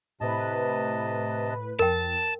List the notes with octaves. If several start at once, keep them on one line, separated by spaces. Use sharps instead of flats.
A2 C3 B4 D#5 A5
F2 A#4 G5 A5